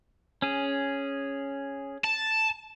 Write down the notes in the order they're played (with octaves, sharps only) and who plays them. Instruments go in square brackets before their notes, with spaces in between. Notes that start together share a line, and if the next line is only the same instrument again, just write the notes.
[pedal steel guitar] C#4 G#4
[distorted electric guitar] A5